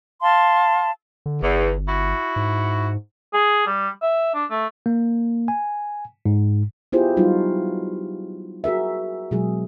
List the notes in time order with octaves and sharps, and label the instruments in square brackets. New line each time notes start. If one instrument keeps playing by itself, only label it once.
[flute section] F5 A5 C6
[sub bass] D3
[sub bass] G1 [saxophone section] E2
[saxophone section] E4 F#4
[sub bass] G#2
[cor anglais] G#4
G3
E5
D4
A3
[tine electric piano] A#3
G#5
G#2
[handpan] B3 E4 F4 G4 G#4 C5
F#3 G3 D#4 F4 F#4
F#4 G#4 A#4 E5
B2 F#3 G#3 G#4